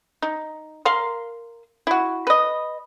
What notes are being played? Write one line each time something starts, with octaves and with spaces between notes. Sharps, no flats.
D#4
A#4 F5 C6
E4 F#4
B4 D#5